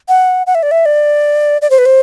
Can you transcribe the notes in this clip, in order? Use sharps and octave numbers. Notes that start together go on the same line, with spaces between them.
F#5
F#5
E5
D5
E5
D5
D5
C5
B4
C5